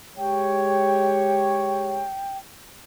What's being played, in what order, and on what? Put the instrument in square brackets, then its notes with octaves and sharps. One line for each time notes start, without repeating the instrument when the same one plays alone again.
[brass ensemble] G#3 G4 C#5 [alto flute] G5